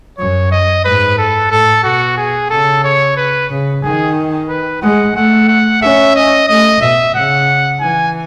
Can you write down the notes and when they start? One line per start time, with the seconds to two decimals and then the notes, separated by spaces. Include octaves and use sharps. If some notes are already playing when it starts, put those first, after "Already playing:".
0.18 F#2 C#5
0.51 D#5
0.84 G#2 B4
1.18 A4
1.50 A2 A4
1.84 B2 F#4
2.17 G#4
2.50 C#3 A4
2.84 C#5
3.17 B4
3.50 C#3
3.83 D#3 G#4
4.49 B4
4.82 G#3 F#5
5.15 A3 F#5
5.48 F#5
5.81 C#4 E5
6.15 D#5
6.48 A3 D#5
6.81 B2 E5
7.14 C#3 F#5
7.80 E3 G#5